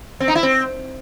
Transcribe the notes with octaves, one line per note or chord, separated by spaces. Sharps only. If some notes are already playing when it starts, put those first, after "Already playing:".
C4
D#4
E4
C4